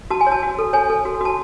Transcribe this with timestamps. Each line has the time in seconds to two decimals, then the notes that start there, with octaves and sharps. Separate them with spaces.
0.10 F#4 A5
0.21 G#5
0.27 C#5
0.32 A5
0.43 F#4
0.59 A4
0.73 C#5 G#5
0.90 A4
1.05 F#4
1.21 F#4 A5